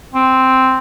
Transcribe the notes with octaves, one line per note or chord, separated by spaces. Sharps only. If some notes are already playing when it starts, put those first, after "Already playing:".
C4